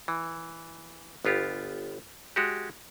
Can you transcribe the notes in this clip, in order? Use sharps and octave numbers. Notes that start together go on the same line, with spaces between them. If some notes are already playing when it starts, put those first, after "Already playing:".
E3
G1 B3 F4 G4
G#3 F#4 G4